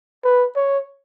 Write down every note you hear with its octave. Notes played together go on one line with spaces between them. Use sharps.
B4
C#5